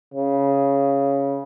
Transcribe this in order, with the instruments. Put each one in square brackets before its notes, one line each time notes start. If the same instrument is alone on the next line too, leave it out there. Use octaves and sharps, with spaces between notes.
[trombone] C#3